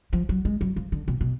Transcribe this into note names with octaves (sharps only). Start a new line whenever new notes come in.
F3
F#3
G#3
F#3
F3
D3
B2
B2